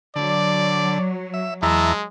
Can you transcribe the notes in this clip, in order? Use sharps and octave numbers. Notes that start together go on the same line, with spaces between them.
D3 F#3 D5
E5
E2 G#3 E5 A5 A#5